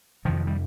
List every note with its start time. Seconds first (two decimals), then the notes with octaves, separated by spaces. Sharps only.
0.25 F2 C3 D#3 F3
0.47 G3